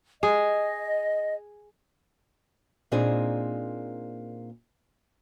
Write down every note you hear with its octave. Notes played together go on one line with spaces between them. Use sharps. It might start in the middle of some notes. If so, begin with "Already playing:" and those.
G#4 D#5
A#2 A#3 C4 D4 D#4 G#4